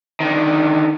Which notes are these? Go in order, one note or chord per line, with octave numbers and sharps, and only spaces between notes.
D3 D#3